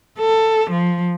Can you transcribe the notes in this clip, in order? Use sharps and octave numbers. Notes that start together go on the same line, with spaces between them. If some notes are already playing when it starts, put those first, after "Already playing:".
A4
F3